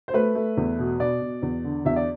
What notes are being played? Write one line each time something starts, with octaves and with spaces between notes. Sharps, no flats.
C5
A3 B4
A3
E2
B2
B2 D5
B2
E2
D3
E2 E5
D5